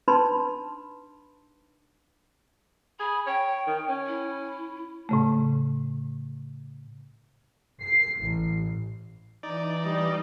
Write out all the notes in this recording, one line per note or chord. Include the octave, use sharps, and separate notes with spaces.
D4 D#4 B4 A5 B5 C6
G#4 B5
C#5 G5
D#3
C#4
E4
A2 C#3 A3
C7
A1
E3 D#4 D5
G3 D#5